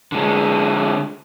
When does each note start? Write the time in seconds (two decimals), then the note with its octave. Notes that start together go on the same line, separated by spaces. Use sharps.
0.12 D3 G#3